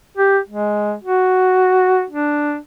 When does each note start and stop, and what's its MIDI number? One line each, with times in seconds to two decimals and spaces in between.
0.17 0.39 67
0.49 0.93 56
1.03 2.04 66
2.10 2.57 62